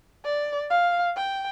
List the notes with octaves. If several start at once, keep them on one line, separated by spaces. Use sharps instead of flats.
D5
F5
G5